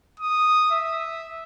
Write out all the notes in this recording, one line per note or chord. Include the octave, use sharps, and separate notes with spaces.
D#6
E5